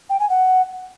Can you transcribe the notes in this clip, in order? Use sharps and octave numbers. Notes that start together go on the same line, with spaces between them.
G5
G#5
F#5